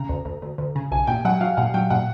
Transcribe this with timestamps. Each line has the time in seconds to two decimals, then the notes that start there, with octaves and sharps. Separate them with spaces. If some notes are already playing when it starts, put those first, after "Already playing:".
Already playing: C#3 A#5
0.09 D2
0.25 D2
0.42 D2
0.58 D2
0.75 C#3
0.91 B1 G#5
1.07 A#2 G5
1.25 F#3 F#5
1.41 F#3 F5
1.57 A#2 F#5
1.74 F#3 G5
1.90 A#2 F#5